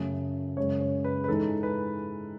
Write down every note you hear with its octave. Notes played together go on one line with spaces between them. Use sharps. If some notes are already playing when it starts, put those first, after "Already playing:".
Already playing: F#2 C#3 F#3 A3 C#4
F#2 C#3 G#3 C#5
C#5
B4
B4
G#2 E3 G#3 D#4 A4
B4